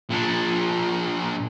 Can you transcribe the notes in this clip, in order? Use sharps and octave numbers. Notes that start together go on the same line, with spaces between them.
A#2 D4